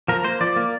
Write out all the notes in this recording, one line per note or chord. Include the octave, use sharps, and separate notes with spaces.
F3 A#4
A#3 C5
F3 D5
A#3